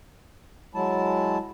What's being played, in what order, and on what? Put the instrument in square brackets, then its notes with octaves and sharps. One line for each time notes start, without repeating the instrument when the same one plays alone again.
[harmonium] F#3 G#3 E4 A5